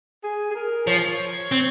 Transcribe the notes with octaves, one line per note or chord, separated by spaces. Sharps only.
G#4
G#4
A#4
F3 C#5
C4